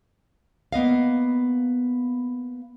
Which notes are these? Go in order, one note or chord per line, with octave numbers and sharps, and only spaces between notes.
A#3 B3 D#5 F5